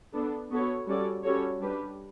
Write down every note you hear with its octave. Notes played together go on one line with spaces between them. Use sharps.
B3 D4 A4
B3 F#4 A4 C#5
G3 C#4 F#4 A4 D5
G3 C#4 F#4 A4 C#5
G3 D4 G4 B4